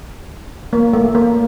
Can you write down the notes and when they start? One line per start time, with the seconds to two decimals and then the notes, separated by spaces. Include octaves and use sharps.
0.73 A#3
0.93 A3
1.15 A#3